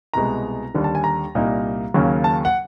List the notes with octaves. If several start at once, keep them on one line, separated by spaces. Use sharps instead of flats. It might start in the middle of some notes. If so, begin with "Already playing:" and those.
C2 B2 G#3 A#5
D#2 D3 G3
A5
G#5
A#5
C2 A#2 G3 A#3 D#4
D#2 C#3 F#3 A#3 C#4
A5
F#5